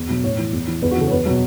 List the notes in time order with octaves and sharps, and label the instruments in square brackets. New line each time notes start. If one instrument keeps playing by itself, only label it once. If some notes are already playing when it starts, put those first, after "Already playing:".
Already playing: [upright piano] E2
B2 F#3
A2 C#5
E3
E2
E3
E2 B4
F#4
C#3 E3 A4
C#5
E2 B4
B2 F#3